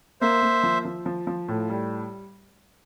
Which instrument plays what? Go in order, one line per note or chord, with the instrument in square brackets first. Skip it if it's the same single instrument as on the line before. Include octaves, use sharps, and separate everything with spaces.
[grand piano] A#3 [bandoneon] C5 E5
[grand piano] A#3
F3
F3
F3
F3
A2
G3